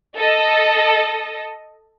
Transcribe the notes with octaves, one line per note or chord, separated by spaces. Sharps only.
A4 D#5